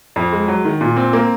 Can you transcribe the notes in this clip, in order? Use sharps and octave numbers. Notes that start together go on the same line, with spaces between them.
F2
G#3
F#3
D#3
A#2
C4
A#3